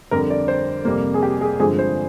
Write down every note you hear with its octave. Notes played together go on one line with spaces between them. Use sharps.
F2 D3 G3 A#4
D5
C5
F2 C3 G3 A#3
G#4
G4
G#4
G2 D3 F3 G#3 C4 G#4
C5